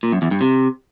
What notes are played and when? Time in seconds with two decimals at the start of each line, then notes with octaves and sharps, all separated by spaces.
0.03 A#2
0.12 F#2
0.22 E2
0.31 G2
0.41 C3